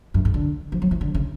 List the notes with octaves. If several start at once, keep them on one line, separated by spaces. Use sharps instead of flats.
F#2
G#2
D3
F3
F#3
F3
D3
C#3